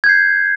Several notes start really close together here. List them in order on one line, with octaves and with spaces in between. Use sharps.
G#6 G6 C7